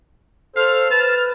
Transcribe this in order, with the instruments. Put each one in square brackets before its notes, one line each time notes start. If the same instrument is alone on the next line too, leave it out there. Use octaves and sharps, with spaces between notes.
[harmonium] A4 C5 [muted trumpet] F5 [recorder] F6
[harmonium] B4 [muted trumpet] A5